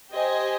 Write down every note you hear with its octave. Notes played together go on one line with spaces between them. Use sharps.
G4 C5 D#5 G#5